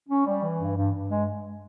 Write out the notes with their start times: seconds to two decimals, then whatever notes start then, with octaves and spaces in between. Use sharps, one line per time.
0.09 C#4
0.26 G3
0.43 E3
0.60 G2
0.76 G2
0.93 G2
1.10 G#3